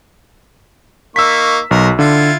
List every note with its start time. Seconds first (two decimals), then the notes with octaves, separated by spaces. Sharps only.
1.16 A#3 D#4 C#6 E6 B6
1.71 B1 A#4
1.99 D3 E4 F4